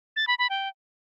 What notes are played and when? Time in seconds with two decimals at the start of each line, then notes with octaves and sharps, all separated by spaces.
0.16 A6
0.27 B5
0.39 B5
0.50 G5